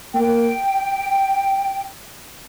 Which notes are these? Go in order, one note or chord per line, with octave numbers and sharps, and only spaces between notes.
A#3 G5